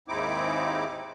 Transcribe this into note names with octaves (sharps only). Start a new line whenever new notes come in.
D#2 G#2 C4 D#4 E4 D6